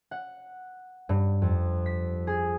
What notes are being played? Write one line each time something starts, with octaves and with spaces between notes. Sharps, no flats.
F#5
G2
F2
B6
G#4